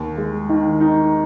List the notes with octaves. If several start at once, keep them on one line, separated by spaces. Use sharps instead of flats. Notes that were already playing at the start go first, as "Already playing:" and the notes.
Already playing: D#2
G#3
D#3
D#4